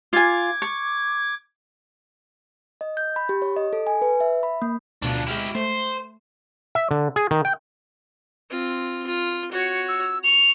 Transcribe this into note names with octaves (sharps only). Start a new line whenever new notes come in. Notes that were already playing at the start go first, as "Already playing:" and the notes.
F4 G#5 D6 G#6
C#6
D#5
G6
B5
G4
C#5
D#5
A4
G#5
B4
E5
B5
A#3
D2 B2 F3 D4
G#3 E4 G4 F6 E7
A3 C5
E5
D3
G#4
D#3
G5
C4 F4
F4
F#4 C#5
E6
C#6 F7